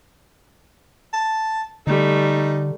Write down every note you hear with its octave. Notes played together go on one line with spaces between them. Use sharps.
A5
D3 G3 A3 D#4